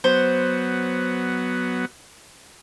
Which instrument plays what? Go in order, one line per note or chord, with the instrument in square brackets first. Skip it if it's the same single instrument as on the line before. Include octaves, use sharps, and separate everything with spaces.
[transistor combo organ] F#3 B3 [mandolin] C5